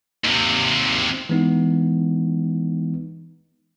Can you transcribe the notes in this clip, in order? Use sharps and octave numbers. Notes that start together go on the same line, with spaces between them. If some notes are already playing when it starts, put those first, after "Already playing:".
D#2 C3
E3 G#3 B3 D#4